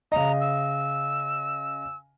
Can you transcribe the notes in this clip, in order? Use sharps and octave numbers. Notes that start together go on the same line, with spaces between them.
C#3 D#5 A#5
E6